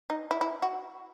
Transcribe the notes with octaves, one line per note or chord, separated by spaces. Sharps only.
D#4
E4
E4
F#4